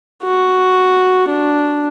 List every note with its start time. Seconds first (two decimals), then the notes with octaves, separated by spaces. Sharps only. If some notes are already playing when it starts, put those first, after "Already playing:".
0.23 F#4
1.28 D4